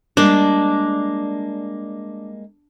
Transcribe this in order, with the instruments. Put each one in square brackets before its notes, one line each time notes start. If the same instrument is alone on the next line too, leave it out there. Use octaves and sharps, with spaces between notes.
[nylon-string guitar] G3 G#3 A#3 [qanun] D4